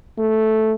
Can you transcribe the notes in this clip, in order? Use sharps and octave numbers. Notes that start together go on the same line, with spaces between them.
A3